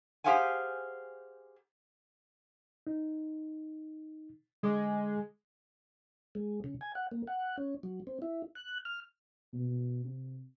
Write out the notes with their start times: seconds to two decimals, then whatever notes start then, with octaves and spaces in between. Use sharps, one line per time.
0.24 G4 G#4 C5 F5 F#5 G#5
2.87 D#4
4.63 D3 G#3 D6
6.35 G#3
6.64 C#3
6.81 G#5
6.95 F#5
7.11 A#3
7.27 F#5
7.58 C#4
7.83 F#3
8.07 C4
8.22 E4
8.55 F#6
8.85 F6
9.53 B2
10.04 C3